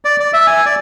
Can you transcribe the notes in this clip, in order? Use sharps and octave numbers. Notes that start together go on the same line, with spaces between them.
D5
D5
E5
G#5
D5